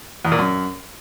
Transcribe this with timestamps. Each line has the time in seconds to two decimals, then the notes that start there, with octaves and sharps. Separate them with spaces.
0.25 E2
0.32 A#2
0.39 F#2